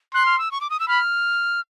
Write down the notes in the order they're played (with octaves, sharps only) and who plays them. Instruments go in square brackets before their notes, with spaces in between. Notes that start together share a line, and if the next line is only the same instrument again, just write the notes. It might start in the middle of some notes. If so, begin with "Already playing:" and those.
[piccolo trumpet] C6 [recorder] F#6
[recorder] F6
E6
C#6
D6
D#6
E6
[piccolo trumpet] B5 [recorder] F6